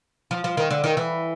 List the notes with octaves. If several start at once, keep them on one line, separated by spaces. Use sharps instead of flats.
F3
F3
D#3
D3
D#3
E3